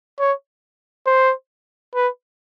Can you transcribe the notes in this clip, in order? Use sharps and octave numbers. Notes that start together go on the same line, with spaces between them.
C#5
C5
B4